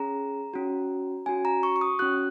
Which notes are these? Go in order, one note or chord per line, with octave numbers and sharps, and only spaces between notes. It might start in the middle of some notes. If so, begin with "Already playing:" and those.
Already playing: C#4 G#4 A#5
C#4 F#4
C#4 F#4 G#5
A#5
C#6
C#6
D#6
C#4 F#4 F#6